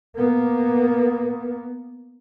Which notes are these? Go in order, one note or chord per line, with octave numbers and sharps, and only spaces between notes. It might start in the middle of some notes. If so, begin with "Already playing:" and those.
A#3 B3